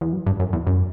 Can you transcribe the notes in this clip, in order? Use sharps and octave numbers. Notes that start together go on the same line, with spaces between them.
E2
F#2
G2
F#2
E2
F#2